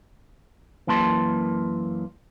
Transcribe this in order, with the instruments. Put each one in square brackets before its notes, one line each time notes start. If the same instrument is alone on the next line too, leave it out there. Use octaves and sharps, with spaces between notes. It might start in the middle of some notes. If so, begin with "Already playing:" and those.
[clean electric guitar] F#2 E3 A#3 A5 C6